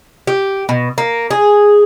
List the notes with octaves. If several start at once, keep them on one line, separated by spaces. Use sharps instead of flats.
G4
B2
A#3
G#4